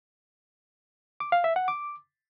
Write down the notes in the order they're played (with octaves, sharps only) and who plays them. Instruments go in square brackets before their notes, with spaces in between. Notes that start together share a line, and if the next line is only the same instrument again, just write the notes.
[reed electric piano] D6
F5
E5
F#5
D6